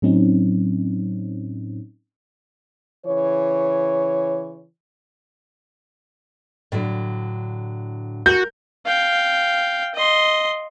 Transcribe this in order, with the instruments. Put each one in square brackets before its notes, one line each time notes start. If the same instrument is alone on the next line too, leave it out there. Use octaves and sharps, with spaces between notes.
[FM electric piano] A2 F#3 C4 C#4 D#4
[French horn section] C#3 E3 C#5
[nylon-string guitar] A2 D3 F#3
[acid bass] F#4 [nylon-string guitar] A#4 [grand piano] G6
[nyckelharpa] F5 G5
D#5 C6